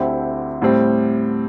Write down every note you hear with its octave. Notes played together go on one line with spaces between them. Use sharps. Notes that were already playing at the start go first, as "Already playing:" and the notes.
Already playing: D2 D3 C4 E4 G4
A2 G3 C4